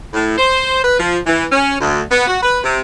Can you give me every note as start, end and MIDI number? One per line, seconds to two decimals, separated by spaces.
0.13 0.36 45
0.37 0.79 72
0.83 0.96 71
0.99 1.18 53
1.27 1.46 52
1.52 1.76 61
1.80 2.01 38
2.10 2.27 59
2.27 2.38 66
2.42 2.60 71
2.63 2.81 48